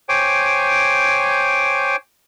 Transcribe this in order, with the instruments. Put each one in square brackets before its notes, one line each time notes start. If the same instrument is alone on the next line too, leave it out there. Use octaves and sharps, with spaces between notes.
[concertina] C5 C#5 G5 G#5 D6